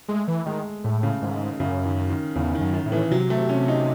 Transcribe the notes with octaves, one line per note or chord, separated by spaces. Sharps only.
G#3 A3
E3
D#3 G#3
A2 A3
C#3
G#2 D#3
F#2 C#3
D#3
D#3
E2 C#3
D#3
F#2
D#3
A2
E3
C3 F#3
A3
C#4
D#4